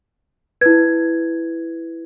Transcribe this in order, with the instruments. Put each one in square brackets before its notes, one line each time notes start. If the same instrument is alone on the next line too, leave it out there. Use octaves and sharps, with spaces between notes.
[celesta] E4 B4 G#6